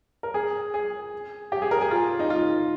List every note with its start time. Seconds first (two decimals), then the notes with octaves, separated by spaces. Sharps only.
0.23 A#4
0.34 G#4
0.74 G#4
1.52 G4
1.62 G#4
1.71 A#4
1.81 G#4
1.91 F4
2.19 D#4
2.30 F4